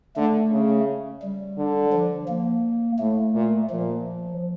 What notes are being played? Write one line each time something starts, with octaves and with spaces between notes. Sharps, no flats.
D3 A3
C#3
G3
D3
F3
A#3
A2 A3
A#2
A#2 F3